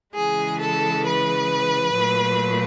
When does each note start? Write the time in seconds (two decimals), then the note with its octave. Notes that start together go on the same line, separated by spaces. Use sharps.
0.14 C#3 E3 G#3 G#4
0.59 A4
1.05 B4
1.94 A#2 F#3 A3